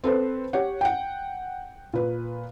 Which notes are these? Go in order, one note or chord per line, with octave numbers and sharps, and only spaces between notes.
C4 A4 B4 C5
G4 C#5 F#5
F#5 G5
A#2 B4